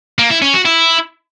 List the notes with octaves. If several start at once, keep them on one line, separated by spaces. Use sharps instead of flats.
A#3
E4
C#4
F#4
E4